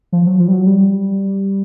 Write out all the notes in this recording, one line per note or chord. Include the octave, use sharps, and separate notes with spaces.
F3
F#3
F3
G3
F#3
G3